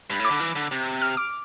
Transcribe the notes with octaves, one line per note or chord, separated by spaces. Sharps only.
G2 B5
A2
D6
D3
E3
D3
C3
F6
D6